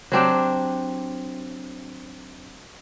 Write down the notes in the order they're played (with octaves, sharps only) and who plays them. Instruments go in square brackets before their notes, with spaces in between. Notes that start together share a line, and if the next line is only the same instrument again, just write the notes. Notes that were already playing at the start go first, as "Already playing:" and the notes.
[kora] F#3 C4 D4 G4